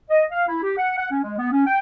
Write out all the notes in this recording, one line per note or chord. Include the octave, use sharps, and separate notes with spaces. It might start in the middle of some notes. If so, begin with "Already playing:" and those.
D#5
F5
E4
G4
F#5
F#5
C#4
G#3
B3
C#4
G5